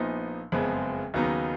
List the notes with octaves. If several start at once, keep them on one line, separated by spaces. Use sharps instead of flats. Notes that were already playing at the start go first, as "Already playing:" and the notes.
Already playing: A#1 A#2 F3 B3 D#4
F#1 F2 F3 G#3 B3
D#2 C#3 F#3 B3 D#4